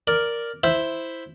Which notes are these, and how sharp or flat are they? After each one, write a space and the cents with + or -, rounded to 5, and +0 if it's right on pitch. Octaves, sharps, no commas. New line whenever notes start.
A#4 +0 D5 +0
E4 +0 C5 +0 E5 +0